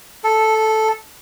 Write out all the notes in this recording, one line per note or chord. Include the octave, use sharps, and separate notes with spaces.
A4